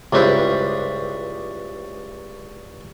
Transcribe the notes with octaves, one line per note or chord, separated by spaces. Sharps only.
C#2 G2 E4 B4 C5